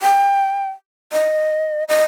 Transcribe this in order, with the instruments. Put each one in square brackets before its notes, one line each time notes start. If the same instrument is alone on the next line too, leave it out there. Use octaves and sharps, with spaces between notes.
[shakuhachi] G5
D#5
D#5